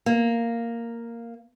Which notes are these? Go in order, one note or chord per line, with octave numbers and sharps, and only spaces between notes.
A#3